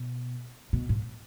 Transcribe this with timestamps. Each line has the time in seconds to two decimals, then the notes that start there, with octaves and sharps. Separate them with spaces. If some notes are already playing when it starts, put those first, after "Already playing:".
Already playing: B2
0.73 B2
0.89 G#2